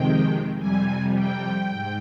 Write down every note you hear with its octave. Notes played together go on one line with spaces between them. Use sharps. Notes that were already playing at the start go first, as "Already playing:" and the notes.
Already playing: F2 C3 D#3 G#3 G5
F2 C3 G3 G#5
G5
G#2